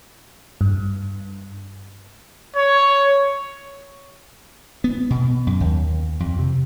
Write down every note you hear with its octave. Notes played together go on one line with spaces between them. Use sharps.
G2
C#5
B3
B2
F#2
D#2
F2
C3